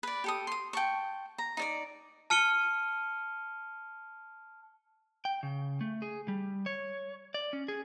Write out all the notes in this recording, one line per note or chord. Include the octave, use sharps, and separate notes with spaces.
B4 D5
G4 A4 D#6
C6 D#6
G5 A5 C#6
A#5
D#4 D5 D6
A5 F6 C#7 D#7 G7
G5
C#3
A3
G#4
G3
C#5
D5
C#4
G#4